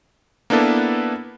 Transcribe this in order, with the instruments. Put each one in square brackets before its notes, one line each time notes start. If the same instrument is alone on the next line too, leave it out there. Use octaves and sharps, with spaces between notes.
[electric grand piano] A#3 B3 D4 E4 A4 B4